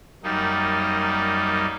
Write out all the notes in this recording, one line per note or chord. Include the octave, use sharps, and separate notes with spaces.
F#2 G3 A#3 D#4